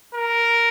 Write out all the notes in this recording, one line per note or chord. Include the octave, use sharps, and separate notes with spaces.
A#4